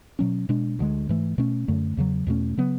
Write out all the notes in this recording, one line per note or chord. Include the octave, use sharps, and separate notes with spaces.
B2 F#3 C#4
B2 G#3 D4
D2 D3 G#3
G#2 E3 A3
B2 A3 C#4
F#2 D3 A3
E2 C#3 F#3
E2 B2 A3 C#4
C#3 F#3 B3